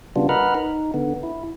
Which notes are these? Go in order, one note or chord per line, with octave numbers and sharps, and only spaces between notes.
C#3 G3 B3 D4 F4
A#4 B4 D#5 F#5 B5 F6
D#4
D3 B3
E4